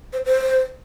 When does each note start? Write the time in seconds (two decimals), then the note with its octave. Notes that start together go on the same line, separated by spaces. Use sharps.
0.13 C5
0.26 C5